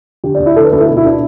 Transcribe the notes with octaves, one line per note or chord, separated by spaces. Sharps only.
D3 G4
D5
D2
E4
D3 A4
B4
D2 A4
E4
B2
E4
D4